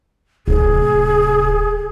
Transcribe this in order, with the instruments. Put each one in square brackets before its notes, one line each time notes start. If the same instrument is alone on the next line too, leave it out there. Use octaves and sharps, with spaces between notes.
[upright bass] D1 C3 [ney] G#4